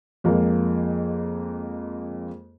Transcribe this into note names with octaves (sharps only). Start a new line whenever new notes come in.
F2 G#3 A#3